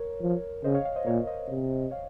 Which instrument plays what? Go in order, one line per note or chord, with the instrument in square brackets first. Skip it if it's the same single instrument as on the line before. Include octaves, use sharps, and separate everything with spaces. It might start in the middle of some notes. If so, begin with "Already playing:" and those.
Already playing: [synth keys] A#4 C#5
[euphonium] F3
[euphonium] C#3 [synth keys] C5 D#5
[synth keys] C#5 F5
C#5 F5
C5 D#5
[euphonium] A#2 [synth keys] A#4 C#5
[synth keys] C5 D#5
[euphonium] C3
[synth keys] C#5 F5